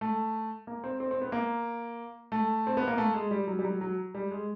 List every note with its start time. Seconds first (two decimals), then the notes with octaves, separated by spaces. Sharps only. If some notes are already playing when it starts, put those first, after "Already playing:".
0.01 A3
0.67 A#3
0.84 C4
1.00 C4
1.11 C4
1.21 B3
1.32 A#3
2.32 A3
2.67 C4
2.77 B3
2.88 A#3
2.98 A3
3.14 G#3
3.31 G3
3.47 F#3
3.59 G3
3.65 F#3
3.81 F#3
4.15 G3
4.31 G#3